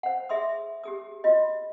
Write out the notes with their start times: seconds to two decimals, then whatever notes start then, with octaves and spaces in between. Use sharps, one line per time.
0.03 C5 F#5
0.29 G#4 E5 C6 D#6
0.84 G4 G#4 D#6
1.24 F4 F#4 D#5